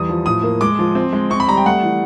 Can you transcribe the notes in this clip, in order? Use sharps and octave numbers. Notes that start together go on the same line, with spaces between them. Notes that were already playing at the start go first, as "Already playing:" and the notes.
Already playing: E2 G3 D#6
F3
A2 D#6
A#3
G#3 D6
F3
C4
G#3
C4 C#6
B5
G3 A#5
G5
A3 F#5
E3